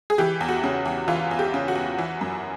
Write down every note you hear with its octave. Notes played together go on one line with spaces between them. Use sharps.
G#4
E3 G4
E2
F#4
C#3
E2
E3 F4
E2
G4
C#3
F#4
E2
E3
F#2